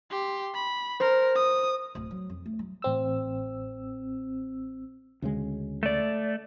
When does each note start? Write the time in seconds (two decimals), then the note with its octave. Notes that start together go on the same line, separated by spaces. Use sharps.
0.11 G4 C6
0.54 B5
1.00 A#4 C5
1.35 D#6
1.95 D1
2.11 F#3
2.30 F2
2.46 A3
2.59 F#3
2.82 A1 C4 E6
5.22 D2 C#3 G#3
5.83 A3 D5